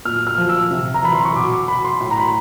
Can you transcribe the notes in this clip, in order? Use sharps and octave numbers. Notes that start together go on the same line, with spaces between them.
A#2 F6
F6
F3
E6
C3
A#5
E3 B5
C6
C#6
B2 D6
D6
B5
C6
A2 C6
A#5
B5